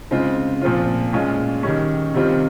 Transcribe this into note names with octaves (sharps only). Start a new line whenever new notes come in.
C#3 G#3 C4 F4
A#2 F3 C4 F4
A#2 G#3 C#4 F4
D#3 G3 C#4
C3 D#3 G3 C4 F4